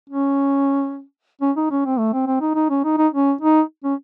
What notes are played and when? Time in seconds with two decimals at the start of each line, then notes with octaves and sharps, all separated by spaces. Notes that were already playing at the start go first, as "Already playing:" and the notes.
0.10 C#4
1.42 C#4
1.57 D#4
1.71 C#4
1.85 C4
1.99 A3
2.13 C4
2.27 C4
2.41 D#4
2.55 D#4
2.70 C#4
2.85 D#4
2.98 D#4
3.13 C#4
3.41 D#4
3.84 C#4